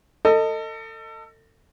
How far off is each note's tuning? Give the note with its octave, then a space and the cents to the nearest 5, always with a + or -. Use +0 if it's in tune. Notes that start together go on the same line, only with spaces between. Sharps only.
A4 +30 D#5 +0